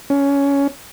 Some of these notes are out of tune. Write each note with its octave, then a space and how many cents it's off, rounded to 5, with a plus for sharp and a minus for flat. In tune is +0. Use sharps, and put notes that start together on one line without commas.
C#4 +15